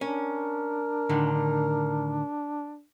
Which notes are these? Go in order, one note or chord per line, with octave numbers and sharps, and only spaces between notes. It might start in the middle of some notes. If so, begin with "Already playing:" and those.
C#4 D4 A#4
A2 D3 D#3